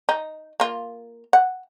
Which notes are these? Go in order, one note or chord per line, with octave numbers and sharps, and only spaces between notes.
D#4
A#3 F4
F#5